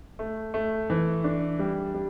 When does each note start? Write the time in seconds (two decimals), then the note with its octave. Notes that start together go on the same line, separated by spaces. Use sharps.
0.19 A3
0.54 A3
0.90 E3
1.24 D4
1.59 G3
1.94 G3